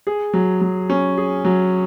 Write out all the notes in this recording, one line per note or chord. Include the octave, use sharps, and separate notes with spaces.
G#4
F#3
F#3
C#4
G#4
F#3